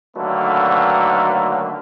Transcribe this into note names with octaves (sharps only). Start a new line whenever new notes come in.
D3 D#3 F#3 A3 A#3 B4